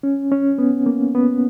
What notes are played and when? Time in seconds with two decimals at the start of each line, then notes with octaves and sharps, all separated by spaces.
0.03 C#4
0.32 C#4
0.58 B3
0.86 A#3
1.15 B3